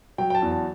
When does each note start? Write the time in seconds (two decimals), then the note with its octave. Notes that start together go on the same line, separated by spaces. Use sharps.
0.18 F#3 G5
0.30 G5
0.35 A5
0.42 E2
0.51 A5